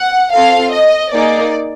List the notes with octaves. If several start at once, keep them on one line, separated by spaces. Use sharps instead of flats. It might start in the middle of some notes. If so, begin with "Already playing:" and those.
Already playing: F#5
C4 F4 A4 F5
D#5
A#3 D#4 G#4 D5